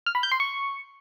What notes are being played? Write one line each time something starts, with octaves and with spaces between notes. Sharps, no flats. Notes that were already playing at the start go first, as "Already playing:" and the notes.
F6
B5
G6
C6
C#6